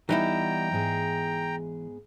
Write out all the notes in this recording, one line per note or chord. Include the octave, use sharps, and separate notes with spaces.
E3 G3 B3 D#4 E4 G5 A#5
G#2 B3 G#4